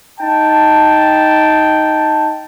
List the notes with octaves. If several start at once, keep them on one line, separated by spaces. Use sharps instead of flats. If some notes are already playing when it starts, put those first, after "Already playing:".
D#4 G5 A5